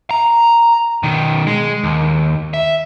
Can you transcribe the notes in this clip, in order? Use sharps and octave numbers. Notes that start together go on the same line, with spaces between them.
A#5
B1 D#3
G#3
D#2
E5